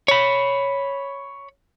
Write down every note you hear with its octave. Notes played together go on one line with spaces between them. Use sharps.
C#5 B5